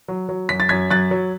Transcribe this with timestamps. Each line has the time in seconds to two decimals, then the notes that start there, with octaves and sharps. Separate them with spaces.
0.08 F#3
0.29 F#3
0.49 F#2 B6
0.60 A6
0.69 F#2 G#6 B6
0.90 F#2 F#6 A6
1.11 F#3